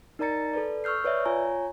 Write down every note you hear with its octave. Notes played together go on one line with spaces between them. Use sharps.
D#4 A#4 D5 A#5 A6 C#7
A4 B4 D5
C#6 E6 F6 G6 C7
B4 C#5 D5 E5
F4 C#5 G#5 A#5